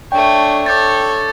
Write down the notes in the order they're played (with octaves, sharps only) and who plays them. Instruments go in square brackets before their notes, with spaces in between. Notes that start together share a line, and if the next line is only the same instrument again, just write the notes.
[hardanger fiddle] A3 D4 [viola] C#5 [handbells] G5
[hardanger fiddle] A4 [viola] C#5 [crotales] D6 G6 A6